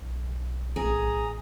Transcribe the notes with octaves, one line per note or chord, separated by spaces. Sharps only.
B1
A1 G#4 A#5 D#6